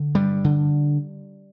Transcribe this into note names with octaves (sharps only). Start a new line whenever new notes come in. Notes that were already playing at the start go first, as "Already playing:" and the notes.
Already playing: D3
G2 G3
D3